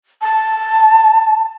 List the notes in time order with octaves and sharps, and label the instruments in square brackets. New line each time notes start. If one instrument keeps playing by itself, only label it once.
[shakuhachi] A5